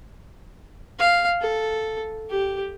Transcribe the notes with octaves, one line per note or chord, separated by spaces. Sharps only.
F5
A4
G4